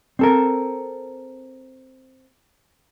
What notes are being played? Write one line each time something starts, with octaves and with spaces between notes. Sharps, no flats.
C4 A4 A#4